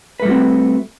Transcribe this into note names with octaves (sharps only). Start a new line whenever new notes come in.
G3 A3 C4 F#4 B4